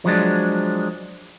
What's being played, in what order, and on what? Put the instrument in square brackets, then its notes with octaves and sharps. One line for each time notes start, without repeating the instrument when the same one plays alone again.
[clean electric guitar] F3 F#3 G#3 D4